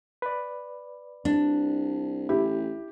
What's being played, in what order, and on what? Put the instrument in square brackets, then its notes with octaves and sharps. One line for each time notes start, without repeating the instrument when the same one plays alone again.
[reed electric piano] B4 D5
[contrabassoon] C2 [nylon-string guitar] D4
[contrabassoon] A1 [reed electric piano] E4 [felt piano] G4